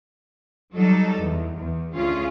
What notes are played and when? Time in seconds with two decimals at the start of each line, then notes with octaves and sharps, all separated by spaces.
0.74 F#3 G3 D#4 A4
1.19 E2
1.56 E2
1.96 D2 C#4 F4 G#4